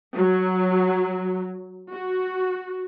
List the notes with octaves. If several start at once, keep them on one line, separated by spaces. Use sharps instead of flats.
F#3
F#4